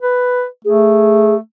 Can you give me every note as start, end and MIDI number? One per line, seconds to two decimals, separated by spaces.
0.01 0.45 71
0.65 1.37 57
0.65 1.35 68